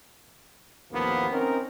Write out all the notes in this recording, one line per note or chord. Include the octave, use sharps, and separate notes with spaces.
A1 D#2 F3 A#3 B3
C4 C#4 D#4 A#4